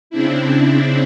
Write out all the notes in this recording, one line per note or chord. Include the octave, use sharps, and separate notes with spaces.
C#3 C4 D4 E4